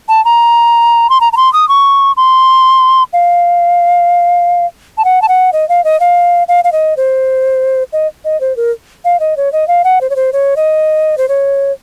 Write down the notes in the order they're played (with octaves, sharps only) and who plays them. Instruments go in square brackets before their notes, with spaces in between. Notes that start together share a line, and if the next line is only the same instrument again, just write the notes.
[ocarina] A5
A#5
C6
A#5
A#5
C6
D#6
C#6
C6
F5
A5
F#5
A5
F#5
D#5
F5
D#5
F5
F5
F5
D#5
C5
D#5
D#5
C5
A#4
F5
D#5
C#5
D#5
F5
F#5
C5
C#5
C5
C#5
D#5
C5
C#5